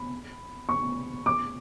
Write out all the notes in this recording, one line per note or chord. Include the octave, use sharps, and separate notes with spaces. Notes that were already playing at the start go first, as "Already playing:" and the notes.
Already playing: B5
C#6
D6